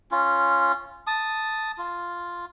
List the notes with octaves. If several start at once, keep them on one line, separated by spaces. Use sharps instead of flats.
C#4 F4
A5 D#6
F4